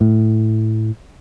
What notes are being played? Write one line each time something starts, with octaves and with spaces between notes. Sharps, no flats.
A2